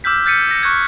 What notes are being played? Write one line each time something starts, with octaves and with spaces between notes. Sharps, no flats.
D6 E6 F6 G6 B6
F6 G6 A6 B6 C#7 D#7
A#6 C#7
C#6 F#6 G#6